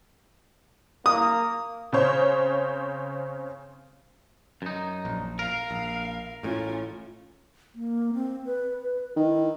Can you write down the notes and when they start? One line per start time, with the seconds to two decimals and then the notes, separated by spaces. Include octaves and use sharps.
1.06 A#3 D#6
1.92 C#3 C4 C5 C#5
4.62 F#2 D#4
5.05 A#1
5.39 A#4 F5
5.71 A#1
6.43 A1 A2 C#4 F4
7.75 A#3
8.14 C4
8.46 B4
8.79 B4
9.17 D#3 E4